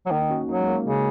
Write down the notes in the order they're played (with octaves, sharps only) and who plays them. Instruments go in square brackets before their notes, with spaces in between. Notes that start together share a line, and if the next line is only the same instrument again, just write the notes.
[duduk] F#3
[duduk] D#3 [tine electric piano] A#3 D#4
[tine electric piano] D#4
C#4 F#4
[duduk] F#3 [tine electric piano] A#3 D#4
[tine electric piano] G#3
A#3
[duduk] C#3 [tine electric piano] G#3